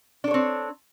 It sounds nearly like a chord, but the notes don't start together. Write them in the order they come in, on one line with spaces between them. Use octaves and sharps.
D4 A4 C#5 C4